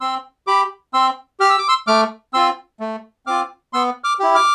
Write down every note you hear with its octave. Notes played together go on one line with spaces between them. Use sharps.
C4 C6 E6
G4 B5 D6
C4 C6 E6
G4 F6
E6
D6
C6 E6
A3 D6 F6
C4 F4 C6 E6
A3
C4 F4 D6 F6
B3 C6 E6
D6 F6
E4 G4
D6 F6